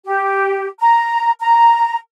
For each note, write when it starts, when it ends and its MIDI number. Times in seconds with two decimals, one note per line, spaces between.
0.05 0.67 67
0.80 1.31 82
1.41 1.97 82